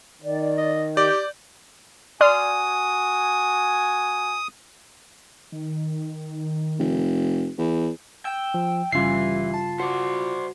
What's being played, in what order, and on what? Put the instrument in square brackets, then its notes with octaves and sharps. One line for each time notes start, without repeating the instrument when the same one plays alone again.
[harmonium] D#3 [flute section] D5
[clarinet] D#5
[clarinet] G4 [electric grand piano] D5 [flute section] D6 G6
[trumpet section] F#4 G#5 [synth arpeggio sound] D5 C6 F6 [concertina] D#6
[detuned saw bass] D#3
[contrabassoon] F1
E2
[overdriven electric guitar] G5 [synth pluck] E6
[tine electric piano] F3
[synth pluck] G1 C#3 G3 [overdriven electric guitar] E3 [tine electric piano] F4 C7
[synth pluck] A5
[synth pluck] F#4 [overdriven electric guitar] C5 D5